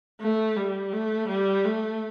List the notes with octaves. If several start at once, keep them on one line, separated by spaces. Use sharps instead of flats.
A3
G3
A3
G3
A3